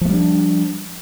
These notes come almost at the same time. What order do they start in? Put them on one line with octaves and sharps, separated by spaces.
F3 A3 G3 D4